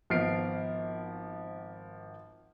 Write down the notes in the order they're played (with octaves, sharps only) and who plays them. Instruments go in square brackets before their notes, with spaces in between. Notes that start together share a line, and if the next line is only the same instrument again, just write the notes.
[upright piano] G#1 F3 B3 F6 C7 D7